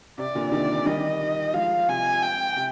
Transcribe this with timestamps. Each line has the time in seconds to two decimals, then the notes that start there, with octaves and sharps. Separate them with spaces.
0.18 C3 D5
0.35 A#2 D3
0.52 C3 D#3 D5
0.86 D#3 G3 D#5
1.53 F3 G#3 F5
1.88 C3 G#5
2.22 G5
2.56 C3